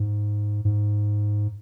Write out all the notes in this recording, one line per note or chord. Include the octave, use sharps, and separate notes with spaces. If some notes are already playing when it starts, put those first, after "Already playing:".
Already playing: G#2
G#2